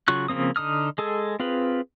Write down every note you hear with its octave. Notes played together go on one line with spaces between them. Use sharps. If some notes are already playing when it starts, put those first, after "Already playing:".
C#3 F#3 F4 C#6 F#6
C#3 F3 A#3 C4 D#6
D3 D#4 D#6 F6
G#3 G#4 A4
C4 F4 G#4 B4